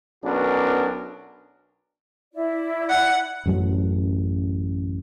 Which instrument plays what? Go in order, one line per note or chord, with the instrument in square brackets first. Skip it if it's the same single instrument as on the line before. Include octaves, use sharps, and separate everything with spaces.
[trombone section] B1 B3 C#4 D4 F#4 A#4
[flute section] E4 D5
[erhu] F#5
[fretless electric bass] A1 F#2 F#3